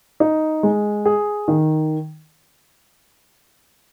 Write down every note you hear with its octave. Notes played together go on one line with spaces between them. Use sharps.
D#4
G#3
G#4
D#3